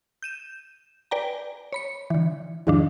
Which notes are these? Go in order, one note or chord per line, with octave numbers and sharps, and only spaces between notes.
G6 D#7 E7
B4 D5 G5 G#5 A#5
C#5 B5 C#7
D3 E3
E2 G#2 D#3 F3 D4